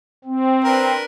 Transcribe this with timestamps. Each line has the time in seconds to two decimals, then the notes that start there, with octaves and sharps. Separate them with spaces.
0.24 C4
0.64 D4 A#4 B4